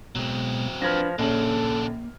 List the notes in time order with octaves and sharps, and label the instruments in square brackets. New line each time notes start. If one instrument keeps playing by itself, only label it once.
[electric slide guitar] B2 G#3 [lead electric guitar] F#3 C4
[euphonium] F3 [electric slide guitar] D4 B4 [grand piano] F6 G#6 A#6
[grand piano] A#1 C#4 F#7 [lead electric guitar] C#3 D4 [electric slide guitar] A#3 [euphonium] A4